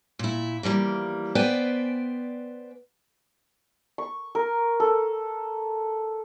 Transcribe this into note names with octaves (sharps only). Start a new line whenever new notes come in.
A#2 E4
E3 F3 G3 A#3
B3 B4 C5 D5 G5 G#5
C#6
A#4
A4